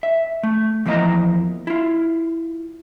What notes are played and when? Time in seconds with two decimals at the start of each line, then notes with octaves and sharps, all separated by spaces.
0.03 E5
0.43 A3
0.86 E2 F3 A#3 E4 D#5 A#5
1.67 E4 F4